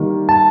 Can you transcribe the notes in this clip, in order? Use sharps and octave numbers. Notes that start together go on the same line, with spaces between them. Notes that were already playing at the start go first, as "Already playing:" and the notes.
Already playing: D#3 G3 A#3
A5